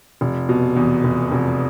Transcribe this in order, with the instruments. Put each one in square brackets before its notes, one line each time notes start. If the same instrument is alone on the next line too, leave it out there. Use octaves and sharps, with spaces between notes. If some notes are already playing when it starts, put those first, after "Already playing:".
[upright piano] F1
B2
E2
F1
F1